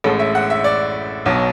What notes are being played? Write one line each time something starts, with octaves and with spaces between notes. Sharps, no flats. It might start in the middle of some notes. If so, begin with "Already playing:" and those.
A1 A2 G#3 A4
E5
F#5
E5
D5
B1 B2 F#3